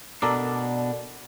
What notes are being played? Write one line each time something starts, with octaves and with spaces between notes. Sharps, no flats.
B2 D4 A4 A#4 D5